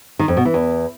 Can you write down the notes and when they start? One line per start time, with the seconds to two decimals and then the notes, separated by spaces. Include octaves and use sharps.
0.19 D#3
0.28 F2
0.37 B2
0.45 E3
0.54 E2